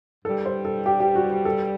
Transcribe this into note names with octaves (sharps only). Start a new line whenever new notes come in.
G2 D3 G3 A4
C5
A4
G4
G4
F#4
A4